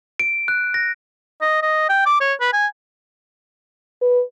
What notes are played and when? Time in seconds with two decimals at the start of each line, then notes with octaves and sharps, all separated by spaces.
0.19 D7
0.48 F#6
0.74 A#6
1.41 D#5
1.63 D#5
1.89 G5
2.06 D6
2.21 C#5
2.40 B4
2.53 G#5
4.02 B4